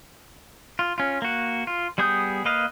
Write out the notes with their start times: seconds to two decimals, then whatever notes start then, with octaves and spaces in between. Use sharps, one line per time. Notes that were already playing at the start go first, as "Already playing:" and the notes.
0.79 F4
0.98 C#4 F4
1.22 A#3 F#4
1.67 F4
1.98 G3 B3 G#4 D#6 G6
2.45 A#3 B4 D#5 F5